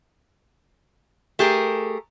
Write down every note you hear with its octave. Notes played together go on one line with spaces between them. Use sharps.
A3 G4 G#4 A#4